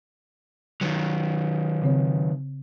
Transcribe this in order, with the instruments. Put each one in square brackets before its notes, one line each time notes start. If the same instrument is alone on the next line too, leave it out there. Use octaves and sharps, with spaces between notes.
[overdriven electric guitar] D#3 F#3
[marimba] C#3 C4 C#5